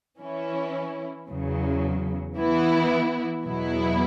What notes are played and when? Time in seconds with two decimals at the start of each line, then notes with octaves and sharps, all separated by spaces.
0.19 E3 C#4 E4
1.28 E2 C#3 F#3
2.37 E3 B3 E4
3.45 E2 B2 F#3 B3 E4